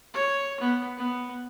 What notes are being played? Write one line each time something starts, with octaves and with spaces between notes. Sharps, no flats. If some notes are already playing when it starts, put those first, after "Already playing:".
C#5
B3
B3